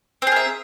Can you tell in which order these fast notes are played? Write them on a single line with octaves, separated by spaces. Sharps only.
C4 G#4 A#4 E5